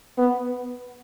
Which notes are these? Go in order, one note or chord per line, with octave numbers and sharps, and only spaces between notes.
B3